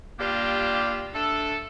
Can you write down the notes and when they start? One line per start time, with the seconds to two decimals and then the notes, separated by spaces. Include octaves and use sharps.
0.19 G3 A#3 D4 F4 G4
1.14 A3 D4 A4